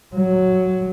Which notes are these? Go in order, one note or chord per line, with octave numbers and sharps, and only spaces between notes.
F#3